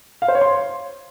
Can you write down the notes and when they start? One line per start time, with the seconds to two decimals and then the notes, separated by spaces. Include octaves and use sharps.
0.22 F5
0.28 C5
0.35 C#5
0.41 C6